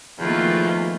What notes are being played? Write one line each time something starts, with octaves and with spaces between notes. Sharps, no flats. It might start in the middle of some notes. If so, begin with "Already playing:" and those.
E2 D#3 F3 A3 A#3 F4